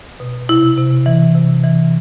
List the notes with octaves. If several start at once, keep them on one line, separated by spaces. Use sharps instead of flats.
B2
C3 E4
C3
E3
C3
E3